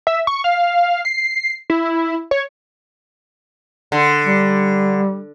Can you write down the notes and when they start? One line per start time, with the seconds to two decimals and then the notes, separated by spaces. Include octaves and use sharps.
0.07 E5
0.27 C#6
0.44 F5
1.05 C7
1.70 E4
2.31 C#5
3.92 D3
4.26 G3